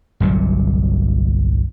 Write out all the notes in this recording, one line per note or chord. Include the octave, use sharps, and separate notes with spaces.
G1 C2 A#2 F#3